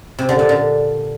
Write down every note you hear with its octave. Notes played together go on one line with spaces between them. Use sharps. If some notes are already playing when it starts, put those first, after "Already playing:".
C3
D3
A#2
D3